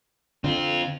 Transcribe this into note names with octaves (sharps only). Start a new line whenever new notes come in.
D3 C4 F4